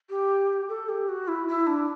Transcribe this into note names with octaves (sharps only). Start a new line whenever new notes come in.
G4
A4
G4
F#4
E4
E4
D4